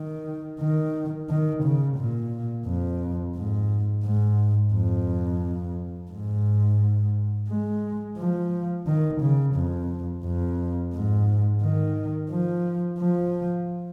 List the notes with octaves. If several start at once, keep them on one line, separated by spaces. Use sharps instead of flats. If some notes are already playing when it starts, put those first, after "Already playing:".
Already playing: D#3
D#3
D#3
C#3
A#2
F2
G#2
G#2
F2
G#2
G#3
F3
D#3
C#3
F2
F2
G#2
D#3
F3
F3